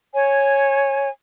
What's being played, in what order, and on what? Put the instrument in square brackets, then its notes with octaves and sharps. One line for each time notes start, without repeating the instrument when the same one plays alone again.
[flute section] C#5 G#5